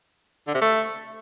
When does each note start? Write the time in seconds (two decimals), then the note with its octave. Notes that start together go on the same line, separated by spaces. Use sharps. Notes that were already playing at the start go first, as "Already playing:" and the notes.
0.47 D3
0.54 C3
0.61 A3